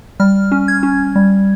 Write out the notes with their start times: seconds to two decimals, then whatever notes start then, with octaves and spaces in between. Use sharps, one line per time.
0.20 G3 F6
0.52 C#4
0.68 G#6
0.83 C#4
1.16 G3